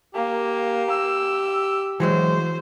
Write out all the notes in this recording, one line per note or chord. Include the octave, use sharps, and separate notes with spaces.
A#3 G4
E6
E3 F#3 G#3 C5